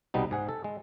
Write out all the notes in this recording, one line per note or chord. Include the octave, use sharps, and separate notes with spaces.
C2 B2 G3 B3 D#4
G#2 G#4 F#5
A4
G#3